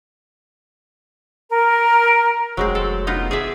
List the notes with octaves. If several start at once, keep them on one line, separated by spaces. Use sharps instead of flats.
A#4
F1 F#3 G#3 C4
A4
B3 D#4 F4
G#4 D5 E5